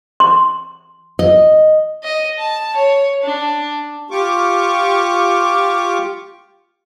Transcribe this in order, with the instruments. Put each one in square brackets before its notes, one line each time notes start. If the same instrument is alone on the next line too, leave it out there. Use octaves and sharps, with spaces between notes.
[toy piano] C6
[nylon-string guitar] D#5
[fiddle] D#5
A5
C#5
D4
[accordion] F4 G4 C#6 D6